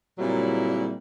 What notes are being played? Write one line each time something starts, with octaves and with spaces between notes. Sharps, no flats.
A#2 C#3 F#3 G3 C4 E4